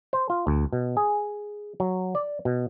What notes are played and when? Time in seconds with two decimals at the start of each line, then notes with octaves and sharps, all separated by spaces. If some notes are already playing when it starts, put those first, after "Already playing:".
0.13 C5
0.30 F4
0.47 D2
0.73 B2
0.97 G#4
1.80 F#3
2.15 D5
2.45 B2